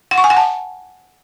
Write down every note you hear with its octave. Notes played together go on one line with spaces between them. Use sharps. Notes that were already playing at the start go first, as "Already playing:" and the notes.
F#5
C#6
G#5
F#5
A5